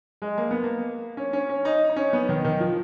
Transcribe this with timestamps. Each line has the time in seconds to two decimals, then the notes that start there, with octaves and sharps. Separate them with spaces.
0.22 G#3
0.38 A#3
0.51 B3
0.64 A#3
1.17 C#4
1.33 C#4
1.49 C#4
1.65 D#4
1.89 D#4
1.96 C#4
2.13 B3
2.29 D#3
2.45 D#3
2.60 F3